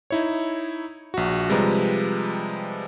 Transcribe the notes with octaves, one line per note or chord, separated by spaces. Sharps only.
D#4 E4 C#5
A#1 F#4
C3 F3 G3 G#3 B4 A#5